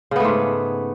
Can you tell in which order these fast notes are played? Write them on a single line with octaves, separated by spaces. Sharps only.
C#3 B3 A3 G#2